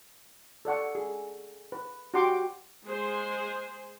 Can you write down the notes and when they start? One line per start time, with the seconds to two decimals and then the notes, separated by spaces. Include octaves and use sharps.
0.65 A4 D5 F#5 C#6
0.95 G#4
1.72 B4
2.14 F#4 G4 F#5 G5 C6 D6
2.85 G#3 G#4 C5